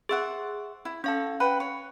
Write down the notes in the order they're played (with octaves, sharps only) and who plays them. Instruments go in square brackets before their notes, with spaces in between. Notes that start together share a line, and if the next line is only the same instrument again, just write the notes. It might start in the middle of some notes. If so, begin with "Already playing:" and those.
[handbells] G#4 [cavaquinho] C5 E5 F#5
[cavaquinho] E4
[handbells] C#4 F5 [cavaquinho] A4 C#5
[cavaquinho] B4 F#5 G5
C#5